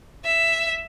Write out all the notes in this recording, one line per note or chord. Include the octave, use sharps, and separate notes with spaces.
E5